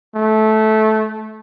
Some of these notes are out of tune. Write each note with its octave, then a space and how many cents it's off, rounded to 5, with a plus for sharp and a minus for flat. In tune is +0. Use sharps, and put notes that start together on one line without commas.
A3 -15